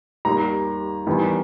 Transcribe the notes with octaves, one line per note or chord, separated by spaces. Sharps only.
D#2 D#3 G3 A#5
E2 D#3 G3